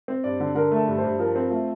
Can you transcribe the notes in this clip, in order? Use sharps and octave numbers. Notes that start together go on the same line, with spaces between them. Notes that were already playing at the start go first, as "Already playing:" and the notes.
C4
G2 D5
D3
D3 A#4
A3 A4
G2
C5
G2
F3 A#4
C4
A3 F4